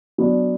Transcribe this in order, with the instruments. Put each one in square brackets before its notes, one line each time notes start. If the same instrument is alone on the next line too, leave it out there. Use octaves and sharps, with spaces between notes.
[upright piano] F#3 B3 D4